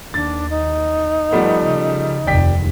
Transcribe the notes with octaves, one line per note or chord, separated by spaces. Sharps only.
D#2 D4 A6
D#4
F3 G3 A3 B3
C#3
F1 D#2 D5 G5 B6